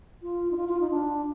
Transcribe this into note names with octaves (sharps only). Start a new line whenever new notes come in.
F4
D#4
F4
F4
D#4
D4